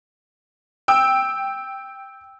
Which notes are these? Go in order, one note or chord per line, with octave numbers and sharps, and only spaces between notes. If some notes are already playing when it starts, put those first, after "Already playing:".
G5 E6